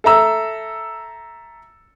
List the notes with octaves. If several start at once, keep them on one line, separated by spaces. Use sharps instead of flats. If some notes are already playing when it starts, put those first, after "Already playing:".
A4 E5 A#5 E6